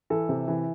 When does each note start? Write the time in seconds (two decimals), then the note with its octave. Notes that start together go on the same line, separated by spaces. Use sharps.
0.10 E3 A4
0.29 C3
0.48 E3